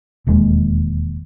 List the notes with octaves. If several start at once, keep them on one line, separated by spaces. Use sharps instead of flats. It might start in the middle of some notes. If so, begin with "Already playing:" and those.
E1 D#2 G#3